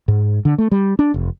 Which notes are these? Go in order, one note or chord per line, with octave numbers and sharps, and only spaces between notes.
G#2
D3
A3
G3
D4
F1